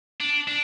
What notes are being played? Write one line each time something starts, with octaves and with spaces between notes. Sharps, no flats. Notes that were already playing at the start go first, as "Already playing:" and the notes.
D4
D4